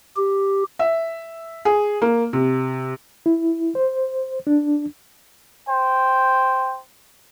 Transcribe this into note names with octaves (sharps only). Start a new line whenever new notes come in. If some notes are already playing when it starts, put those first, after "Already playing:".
G4
E5
G#4
A#3
C3
E4
C5
D4
C5 G5